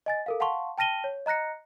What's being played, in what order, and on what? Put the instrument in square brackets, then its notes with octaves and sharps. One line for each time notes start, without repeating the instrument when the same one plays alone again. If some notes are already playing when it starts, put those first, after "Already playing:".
[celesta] D#5 G#5 A6
A4 A#4 F5
F5 F#5 A5 C6 C#6
G5 A5 F6 A#6 D#7 G7
C#5
D#5 A#5 F#6 A#6 C#7